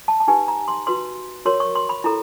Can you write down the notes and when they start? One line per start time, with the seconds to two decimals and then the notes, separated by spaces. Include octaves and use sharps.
0.08 A5
0.20 A5
0.28 D#4 G4 B4 G#5
0.48 A#5
0.68 C6
0.87 F#4 B4 C6
1.45 F#4 A#4 C#5 C6
1.60 C#6
1.75 C6
1.89 B5
2.04 E4 A4 A#5